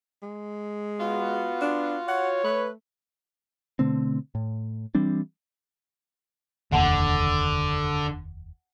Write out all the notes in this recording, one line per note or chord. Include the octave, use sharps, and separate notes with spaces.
G#3
B3 F4 F#4
D4
C#5 F#5
A3 B4
B2 D3 A3 C4
A2
E3 G3 C4 D4
F1 D#2 D3 F#5 A5